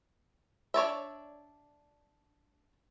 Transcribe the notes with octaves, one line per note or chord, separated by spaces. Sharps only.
D4 C#5 D5 E5